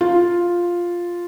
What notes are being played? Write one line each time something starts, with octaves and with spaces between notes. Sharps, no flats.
F4